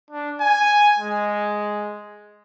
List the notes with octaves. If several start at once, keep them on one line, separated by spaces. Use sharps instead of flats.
D4
G#5
G#3